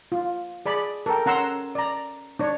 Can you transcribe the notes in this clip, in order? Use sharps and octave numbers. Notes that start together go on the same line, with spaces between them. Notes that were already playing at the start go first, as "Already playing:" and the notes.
F4
G#4 D5 B5
A4 A#4 G5
C#4 F#5 A#5 C6 E6
D5 A#5
D4 C#5